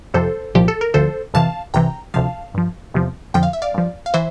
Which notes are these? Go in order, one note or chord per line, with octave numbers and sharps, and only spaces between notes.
F2 C3 F3 A4 C5
C2 A#2 F3 G4
A4
A#4
D2 D3 F3 A4 C5
F2 C3 E3 F5 A5
C2 C3 E3 G5 A#5
D2 C3 F3 F5 A5
G2 F3
E2 C3 F3
F2 D3 F3 G5
F5
E5
D5 F5
G2 F3
F5
E3 C5 E5